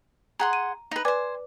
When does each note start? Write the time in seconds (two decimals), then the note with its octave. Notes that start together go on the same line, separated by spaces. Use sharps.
0.40 G#4 F#5 A#5 C6
0.53 D#7
0.91 D#4 B4
1.05 B4 C5 D5 G#5 D6